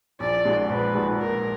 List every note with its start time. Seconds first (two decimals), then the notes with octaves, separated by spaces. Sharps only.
0.20 A#1 D5
0.45 A#2 G#3 D#4 F#4
0.70 A#1 B4
0.95 A#2 G#3 D#4 F#4
1.19 A#1 A#4